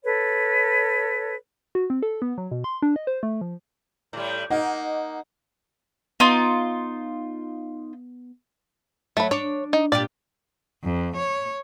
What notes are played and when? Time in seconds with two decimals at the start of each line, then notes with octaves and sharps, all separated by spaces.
0.05 A4 B4 C#5
1.75 F#4
1.90 C4
2.03 A4
2.22 B3
2.38 F#3
2.51 B2
2.64 C6
2.82 D4
2.96 D#5
3.07 C5
3.23 A3
3.41 F3
4.13 A2 G3
4.50 A#3 D#4 D#5 F#5
6.20 B3 D#4 F4
9.17 F#3 A3 B5
9.31 D4 C#5
9.73 D#4
9.92 A#2 F4 G4 D5
10.84 F2
11.17 C#5